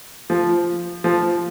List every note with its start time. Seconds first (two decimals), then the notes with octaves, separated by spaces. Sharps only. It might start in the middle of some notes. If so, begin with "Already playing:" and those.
0.30 F3
1.04 F3